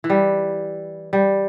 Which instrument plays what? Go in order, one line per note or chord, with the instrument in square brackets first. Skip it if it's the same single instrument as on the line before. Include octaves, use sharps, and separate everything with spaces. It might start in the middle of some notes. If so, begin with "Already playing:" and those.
[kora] E3
G3
G3